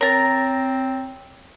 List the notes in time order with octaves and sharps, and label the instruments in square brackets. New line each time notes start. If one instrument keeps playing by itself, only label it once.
[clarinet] C4 [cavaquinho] A#4 A#5 [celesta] C#5 A6